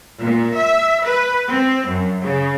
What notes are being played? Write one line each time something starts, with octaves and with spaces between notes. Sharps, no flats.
A#2
E5
B4
C4
F#2
C#3